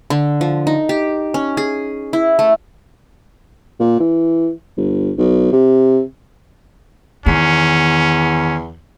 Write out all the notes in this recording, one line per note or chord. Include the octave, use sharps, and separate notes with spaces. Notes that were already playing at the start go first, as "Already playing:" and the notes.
D3
F3
D#4
G4
C#4
G#4
E4
A3
A#2
E3
G1
B1
C3
E2 D#3 B3 C#4